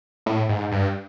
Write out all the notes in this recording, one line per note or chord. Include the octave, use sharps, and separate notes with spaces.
A2
G#2
G2